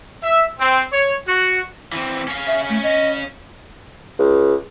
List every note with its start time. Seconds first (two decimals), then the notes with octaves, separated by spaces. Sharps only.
0.23 E5
0.59 C4
0.93 C#5
1.28 F#4
1.92 E3 C4
2.28 C#4 F5
2.47 E5
2.69 A3
2.83 D#5
4.19 C#2